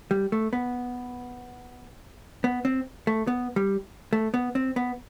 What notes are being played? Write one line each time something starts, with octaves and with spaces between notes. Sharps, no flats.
G3
A3
B3
B3
C4
A3
B3
G3
A3
B3
C4
B3